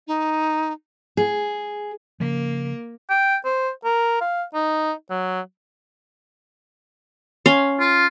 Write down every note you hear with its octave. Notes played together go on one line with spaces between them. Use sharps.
D#4
G#4
C#3 F3 A#3
G5
C5
A#4
F5
D#4
F#3
C#4 F5 C6
F4